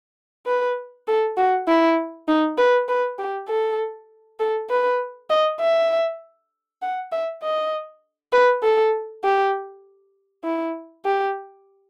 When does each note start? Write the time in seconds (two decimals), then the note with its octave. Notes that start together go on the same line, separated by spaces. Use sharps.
0.47 B4
1.08 A4
1.37 F#4
1.68 E4
2.28 D#4
2.58 B4
2.88 B4
3.19 G4
3.49 A4
4.40 A4
4.70 B4
5.30 D#5
5.61 E5
6.82 F#5
7.12 E5
7.43 D#5
8.32 B4
8.63 A4
9.24 G4
10.44 E4
11.05 G4